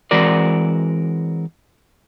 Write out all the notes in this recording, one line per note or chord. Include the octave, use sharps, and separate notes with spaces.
E3 G#3 C4 F#4 A#4 D5